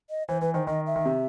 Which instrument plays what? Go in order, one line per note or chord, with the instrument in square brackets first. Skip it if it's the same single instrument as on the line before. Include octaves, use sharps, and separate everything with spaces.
[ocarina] D#5
[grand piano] E3 [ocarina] C5
[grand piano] E3 [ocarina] B4
[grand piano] D#3 [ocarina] C5
[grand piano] D#3 [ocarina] D#5
[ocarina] E5
[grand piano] D#3
C3